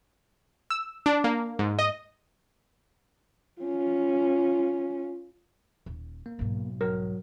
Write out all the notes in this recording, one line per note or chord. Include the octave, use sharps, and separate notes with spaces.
E6
D4
A#3
G#2
D#5
C#4 F4
D#1
A#3
B1 G#2
F#3 A#4